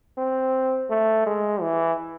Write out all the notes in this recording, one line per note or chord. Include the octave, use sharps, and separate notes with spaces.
C4
A3
G#3
E3